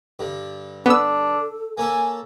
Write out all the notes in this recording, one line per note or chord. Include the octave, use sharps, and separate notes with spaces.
G2 D3
B3 D4 A4 E6
A#3 C#4 A4 G#5